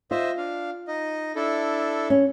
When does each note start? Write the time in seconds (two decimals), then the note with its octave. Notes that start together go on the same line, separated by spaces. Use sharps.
0.11 F4 C5 D#5 E5
0.37 D4 F5
0.88 D#4 D#5
1.36 D4 E4 A4
2.10 C#4